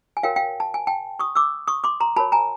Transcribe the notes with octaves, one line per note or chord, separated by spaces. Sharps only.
G#5
F#4 A#4 C#5 F5 G5
F5 G5
A5
G#5
G5 A5
C#6 D#6
D6 E6
C#6 D#6
C6 D6
A#5 C6
F#4 A#4 C#5 A5 B5
G#5 A#5